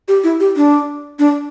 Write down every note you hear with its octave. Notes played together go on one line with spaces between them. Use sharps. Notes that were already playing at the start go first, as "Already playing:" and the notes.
G4
E4
G4
D4
D4